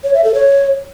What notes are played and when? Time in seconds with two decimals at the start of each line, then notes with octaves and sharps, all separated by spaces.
0.04 C#5
0.14 E5
0.24 A4
0.34 C#5